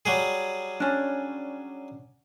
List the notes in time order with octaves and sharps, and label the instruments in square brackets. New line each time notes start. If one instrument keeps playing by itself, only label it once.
[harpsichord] F#3 G3 G#4
[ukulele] C#4 D4